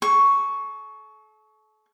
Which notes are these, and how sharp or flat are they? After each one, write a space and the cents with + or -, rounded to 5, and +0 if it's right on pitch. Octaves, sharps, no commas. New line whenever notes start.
A4 -40 C#6 +5